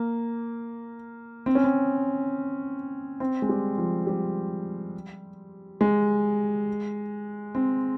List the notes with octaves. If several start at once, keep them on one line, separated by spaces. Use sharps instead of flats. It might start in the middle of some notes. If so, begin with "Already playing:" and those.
Already playing: A#3
C4
C#4
C4
C4
G#3
G3
F3
G3
G#3
C4